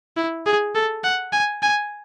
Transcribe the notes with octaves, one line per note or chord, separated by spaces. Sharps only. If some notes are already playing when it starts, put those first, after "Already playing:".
E4
G#4
A4
F#5
G#5
G#5